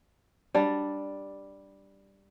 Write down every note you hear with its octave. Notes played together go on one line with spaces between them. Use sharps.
G3 D4